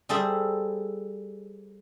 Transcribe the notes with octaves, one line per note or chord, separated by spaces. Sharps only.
G3 G#4 A4 C5 E5